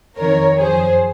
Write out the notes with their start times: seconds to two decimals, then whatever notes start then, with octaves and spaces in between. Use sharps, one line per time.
0.17 F2 D#3 A#4 C#5
0.59 F#2 F3 G#4 C5